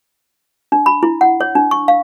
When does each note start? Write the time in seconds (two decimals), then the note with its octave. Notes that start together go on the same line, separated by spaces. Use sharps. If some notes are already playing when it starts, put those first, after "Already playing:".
0.72 D4
0.86 B5
1.03 E4
1.21 F#5
1.40 C#5
1.55 D4
1.71 C#6
1.88 F5